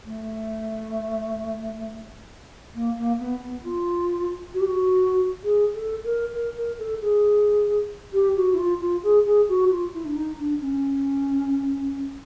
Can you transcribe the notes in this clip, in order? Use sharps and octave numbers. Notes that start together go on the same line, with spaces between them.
A3
A#3
A#3
B3
B3
F4
F#4
G4
F#4
G#4
A4
A#4
A#4
A#4
A4
G#4
G4
F#4
E4
F4
F4
G#4
G#4
F#4
F4
E4
D4
D#4
D4
C#4